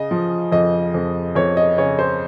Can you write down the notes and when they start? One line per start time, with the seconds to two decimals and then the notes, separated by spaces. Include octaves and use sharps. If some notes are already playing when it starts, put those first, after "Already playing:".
Already playing: C#3 D#5
0.11 F3
0.52 F2 D#5
0.94 F2
1.35 F2 C#5
1.57 D#5
1.78 C#3 C#5
1.99 C5